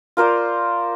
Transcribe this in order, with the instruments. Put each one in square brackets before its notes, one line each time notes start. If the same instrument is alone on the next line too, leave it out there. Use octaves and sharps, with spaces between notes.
[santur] F4 A#4 C5 D5